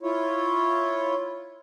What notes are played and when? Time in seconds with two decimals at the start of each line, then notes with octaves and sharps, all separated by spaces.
0.03 E4 F4 C#5